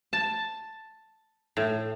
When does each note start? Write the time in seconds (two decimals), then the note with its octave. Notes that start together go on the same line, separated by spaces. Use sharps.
0.13 A5
1.57 A2